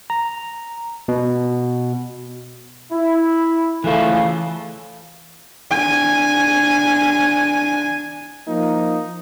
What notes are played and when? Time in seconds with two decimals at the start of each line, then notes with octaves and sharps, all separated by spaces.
0.10 A#5
1.08 B2
2.91 E4
3.84 C#3 E3 A3 F4
5.70 D4 G#5
8.48 F3 A#3 D#4